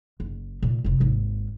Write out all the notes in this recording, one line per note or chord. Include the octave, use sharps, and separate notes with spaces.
F#1
A#2 A3
F1 C3
G#1 D#2